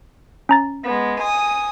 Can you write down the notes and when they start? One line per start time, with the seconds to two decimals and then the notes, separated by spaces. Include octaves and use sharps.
0.49 C#4 A#5 A6
0.84 G#3 B3
1.20 G#5 D#6